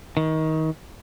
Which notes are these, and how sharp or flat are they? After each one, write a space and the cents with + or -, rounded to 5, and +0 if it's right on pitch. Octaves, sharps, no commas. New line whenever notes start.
D#3 +25